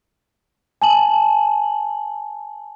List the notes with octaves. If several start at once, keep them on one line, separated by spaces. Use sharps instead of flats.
G#5 A5 F#7